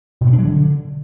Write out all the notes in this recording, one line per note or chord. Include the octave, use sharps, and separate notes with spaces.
B2
B3
D4
F#3
D3